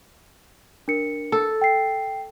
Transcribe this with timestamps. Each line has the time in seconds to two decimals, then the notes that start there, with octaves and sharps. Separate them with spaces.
0.88 D4 A#4 C#7
1.32 A4
1.61 G5 C7